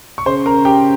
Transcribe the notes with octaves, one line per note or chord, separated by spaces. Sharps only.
C#6
C#3 C5 C6
A#4 A#5
G4 G5